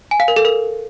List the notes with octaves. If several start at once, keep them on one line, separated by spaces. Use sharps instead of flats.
G#5
F5
A#4
A4
A#4